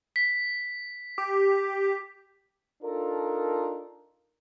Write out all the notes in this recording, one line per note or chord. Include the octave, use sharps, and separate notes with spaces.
B6
G4
D4 D#4 F4 A4 A#4